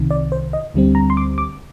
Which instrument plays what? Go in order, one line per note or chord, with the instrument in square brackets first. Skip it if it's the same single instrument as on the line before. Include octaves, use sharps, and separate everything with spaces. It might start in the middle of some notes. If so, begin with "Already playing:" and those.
Already playing: [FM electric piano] C2 C3 D#3
D5
C5
D#5
D2 D3 G3 C4
A#5
C6
D6
D6